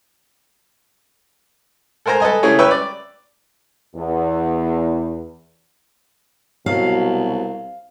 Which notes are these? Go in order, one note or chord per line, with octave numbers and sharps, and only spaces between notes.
A4 A#4 C5 G#5 A#5
A4 B4 D#5 G#5
C#3 G3 A3 E4 G#4 C#5
C#4 B4 C#5 E5 G5
D5
E2
C2 B2 F#3 F5